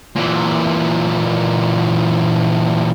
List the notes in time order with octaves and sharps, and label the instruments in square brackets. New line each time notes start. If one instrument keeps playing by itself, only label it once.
[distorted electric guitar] A#2 E3